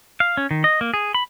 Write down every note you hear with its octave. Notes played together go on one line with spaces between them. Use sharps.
F5
C#4
D#3
D#5
A#3
G#4
B5